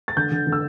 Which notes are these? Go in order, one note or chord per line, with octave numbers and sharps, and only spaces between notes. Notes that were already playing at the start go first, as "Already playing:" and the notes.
A6
D3 G6
D3
D3
E6